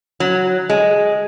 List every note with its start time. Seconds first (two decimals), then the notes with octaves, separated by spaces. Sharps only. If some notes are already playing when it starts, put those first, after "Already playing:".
0.20 F#3
0.69 G#3